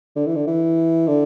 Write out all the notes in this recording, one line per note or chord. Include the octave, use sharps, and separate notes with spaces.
D3
E3
D3
E3
D3